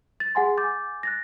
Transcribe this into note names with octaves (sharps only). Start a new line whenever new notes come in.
A6
G#4 F#5 G#5 C6
G#5 D6 G6 A6
F#6 A6 A#6